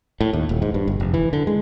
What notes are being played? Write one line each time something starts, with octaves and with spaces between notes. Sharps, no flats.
A2
D#2
D#1
G#2
G2
G1
F1
E3
D3
G#3